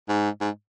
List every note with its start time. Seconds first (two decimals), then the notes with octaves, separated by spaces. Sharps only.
0.08 G#2
0.41 G#2